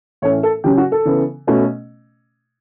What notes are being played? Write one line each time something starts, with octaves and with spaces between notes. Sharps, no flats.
A2 E3 A3 C#4 C#5
A4
C#3 F#3 C#4 G4
F#4
A4
C#3 E3 B3
B2 A3 C#4